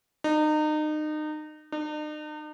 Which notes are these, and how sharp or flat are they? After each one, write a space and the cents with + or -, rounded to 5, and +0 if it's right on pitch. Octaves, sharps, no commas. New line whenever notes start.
D#4 -30
D#4 -45